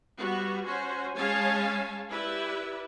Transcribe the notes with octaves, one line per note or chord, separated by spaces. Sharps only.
G3 B3 F#4
C#4 F#4 C5
G#3 C#4 C#5 F5 G#5 A5
E4 G4 B4 D5 E5